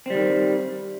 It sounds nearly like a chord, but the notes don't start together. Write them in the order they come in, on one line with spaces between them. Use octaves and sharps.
C4 G3 D#3